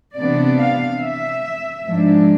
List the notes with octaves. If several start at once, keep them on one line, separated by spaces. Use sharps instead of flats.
C3 E3 B3 D4 D5
F5
E5
G#2 F3 G#3 D4